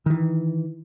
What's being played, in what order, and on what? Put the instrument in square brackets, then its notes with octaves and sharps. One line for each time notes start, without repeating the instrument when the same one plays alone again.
[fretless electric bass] D#3 E3